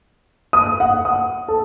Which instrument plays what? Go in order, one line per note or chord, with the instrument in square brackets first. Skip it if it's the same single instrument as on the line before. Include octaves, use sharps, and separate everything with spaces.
[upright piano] D#6
F#5
D#6
A4